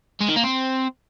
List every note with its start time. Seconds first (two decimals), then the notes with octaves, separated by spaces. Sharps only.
0.21 G#3
0.29 D#3
0.36 A#3
0.44 C4